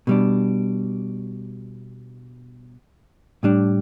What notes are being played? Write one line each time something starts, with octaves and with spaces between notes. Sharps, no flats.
B2 G3 D4
A2 G3 D4